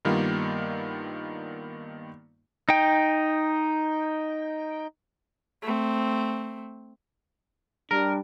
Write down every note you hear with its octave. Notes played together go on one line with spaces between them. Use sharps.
G2 D#3 G3 A#3 B3 F4
D#4 G5
A3 C4
G3 D4 A#4